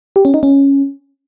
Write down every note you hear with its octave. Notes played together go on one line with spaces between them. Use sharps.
G4
C#4
D#4
C#4